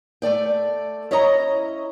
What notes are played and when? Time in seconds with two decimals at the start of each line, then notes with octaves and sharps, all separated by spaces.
0.22 A3 A4 D5 G5
1.11 C#4 E4 C#5 D#5 A#5